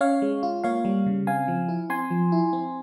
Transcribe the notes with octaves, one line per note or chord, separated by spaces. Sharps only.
C#4 C#5 F5
G#3
F4
A#3 C#5 F5
G3
C#3
C4 F5 G#5
F3
E4
C4 G#5 C6
F3
E4
C4